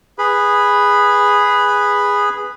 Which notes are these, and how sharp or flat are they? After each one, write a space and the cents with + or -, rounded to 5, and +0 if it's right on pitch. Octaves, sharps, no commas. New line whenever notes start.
G#4 -10 B4 +0 B5 +0